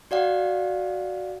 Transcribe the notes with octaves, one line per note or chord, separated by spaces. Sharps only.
F#4 D5 F5 F#5